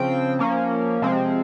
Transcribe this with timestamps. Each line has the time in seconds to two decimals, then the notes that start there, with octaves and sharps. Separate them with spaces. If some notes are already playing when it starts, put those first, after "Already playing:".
Already playing: C#3 F3 C4 G5
0.39 F3 A#3 C#4
1.02 C3 F3 G#3 C4